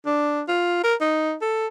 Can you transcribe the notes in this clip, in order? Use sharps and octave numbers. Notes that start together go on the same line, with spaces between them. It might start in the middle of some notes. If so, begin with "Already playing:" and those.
D4
F4
A#4
D#4
A4